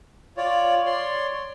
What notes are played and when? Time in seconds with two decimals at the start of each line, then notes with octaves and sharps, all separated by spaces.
0.37 F4 C#5 D5
0.86 C#5 D5 C6